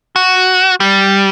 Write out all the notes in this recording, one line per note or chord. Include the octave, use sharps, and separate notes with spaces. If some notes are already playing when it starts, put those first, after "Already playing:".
F#4
G3